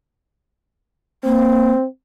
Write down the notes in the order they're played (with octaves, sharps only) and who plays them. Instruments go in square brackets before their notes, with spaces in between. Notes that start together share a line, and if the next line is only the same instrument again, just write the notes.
[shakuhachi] A#3 [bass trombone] C4